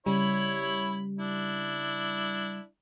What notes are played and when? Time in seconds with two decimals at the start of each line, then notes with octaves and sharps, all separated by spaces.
0.06 C#3 G3 E4 C#5 B5
1.19 D4 E4